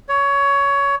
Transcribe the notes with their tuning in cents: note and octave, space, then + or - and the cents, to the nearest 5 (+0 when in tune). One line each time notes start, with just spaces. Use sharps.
C#5 +20